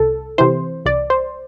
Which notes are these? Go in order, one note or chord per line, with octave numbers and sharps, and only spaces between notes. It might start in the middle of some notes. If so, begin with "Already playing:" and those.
Already playing: C2 A4
C3 E3 C5
C2 D5
C5